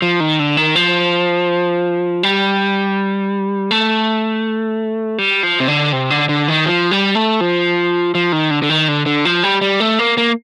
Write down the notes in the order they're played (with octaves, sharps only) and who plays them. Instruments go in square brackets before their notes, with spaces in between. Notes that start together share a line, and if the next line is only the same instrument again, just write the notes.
[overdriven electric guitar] F3
D#3
D3
D#3
F3
G3
A3
G3
F3
C3
D3
C3
D3
D3
D#3
F3
G3
A3
F3
F3
D#3
D3
D3
D#3
D3
D3
F3
G3
G3
A3
A#3
A#3